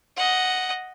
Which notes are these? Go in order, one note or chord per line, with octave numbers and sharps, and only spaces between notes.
D#5 F#5